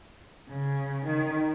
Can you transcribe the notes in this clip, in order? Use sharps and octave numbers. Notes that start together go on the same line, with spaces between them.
C#3
D#3